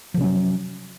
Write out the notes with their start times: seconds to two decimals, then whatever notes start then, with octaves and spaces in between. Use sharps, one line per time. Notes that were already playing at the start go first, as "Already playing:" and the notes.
0.14 F3
0.17 C3
0.21 C#4
0.24 F#3